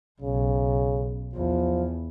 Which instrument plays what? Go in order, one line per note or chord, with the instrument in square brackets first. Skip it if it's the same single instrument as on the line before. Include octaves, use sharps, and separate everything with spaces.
[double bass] B1 [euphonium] C#3
[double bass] E2 [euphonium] F3